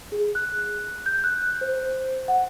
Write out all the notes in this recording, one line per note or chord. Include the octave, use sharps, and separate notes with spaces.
G#4
F#6
G6
F#6
C5
F#5